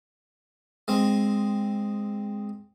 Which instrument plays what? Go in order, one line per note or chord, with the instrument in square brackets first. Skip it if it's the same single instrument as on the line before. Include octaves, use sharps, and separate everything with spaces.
[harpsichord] G#3 C4